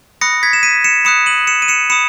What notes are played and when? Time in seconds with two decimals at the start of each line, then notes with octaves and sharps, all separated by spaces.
0.21 B5 D#6 F#6 A#6 C#7
0.43 G#6 B6
0.53 E7
0.63 B6 D#7
0.84 C#7 E7
1.05 B5 D#6 F#6 C#7 E7
1.26 D#7 F#7
1.47 C#7 E7
1.62 D#7
1.68 C#7 E7
1.90 B5 D#6 C#7 E7